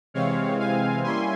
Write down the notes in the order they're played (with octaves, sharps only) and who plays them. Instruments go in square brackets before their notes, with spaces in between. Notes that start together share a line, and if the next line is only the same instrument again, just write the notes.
[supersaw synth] C3 E3 G#3 C4 C#5 F5
F5 G#5
G3 A#3 C#4 E4 G#5 C6